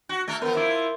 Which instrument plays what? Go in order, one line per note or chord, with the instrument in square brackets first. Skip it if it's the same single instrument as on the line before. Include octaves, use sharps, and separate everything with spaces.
[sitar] F#4
A3 A4 A#4
[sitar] F3 B3 [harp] A#4
[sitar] F3 E4 [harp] E5 C6 D6